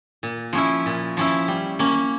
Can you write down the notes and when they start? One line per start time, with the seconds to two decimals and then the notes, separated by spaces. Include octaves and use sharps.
0.23 A#2
0.53 F3 C#4 E4
0.86 A#2
1.17 F3 C#4 E4
1.48 G3
1.79 A#3 C#4